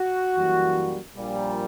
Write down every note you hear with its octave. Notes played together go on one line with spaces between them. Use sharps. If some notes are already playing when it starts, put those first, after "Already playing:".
Already playing: F#4
F#2 E3 G3 A#3
A#1 A#2 G3